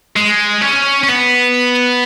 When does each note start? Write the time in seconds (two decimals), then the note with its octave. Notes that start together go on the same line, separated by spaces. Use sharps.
0.16 G#3
0.62 C#4
1.04 C#4
1.08 B3